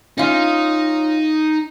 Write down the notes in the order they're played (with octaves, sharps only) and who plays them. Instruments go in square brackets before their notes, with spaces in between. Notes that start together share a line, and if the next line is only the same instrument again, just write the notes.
[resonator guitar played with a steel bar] C#4 F4 [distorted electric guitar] D#4